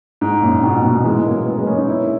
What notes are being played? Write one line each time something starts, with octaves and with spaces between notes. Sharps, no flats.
G#2
F#2 A#2
G#2 B2
G#2 B2
E3 G#3
F#3 A#3
G#3 B3
G#3 B3
A#3 C#4
B3 D#4
C#4 E4